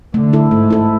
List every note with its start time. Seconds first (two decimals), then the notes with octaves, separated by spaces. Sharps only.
0.14 D3 A3
0.33 E4 A4
0.51 G#2 A3
0.71 E4 A4